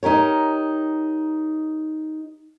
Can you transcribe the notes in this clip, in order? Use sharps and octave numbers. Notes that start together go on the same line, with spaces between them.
D#4 G4 A#4 C#5